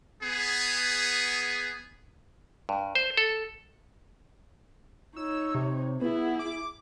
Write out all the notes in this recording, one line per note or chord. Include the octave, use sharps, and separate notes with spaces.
B3 G#4
G2
C5
A4
D#4 C#5 E6
C3
B3 E4 G#4
D6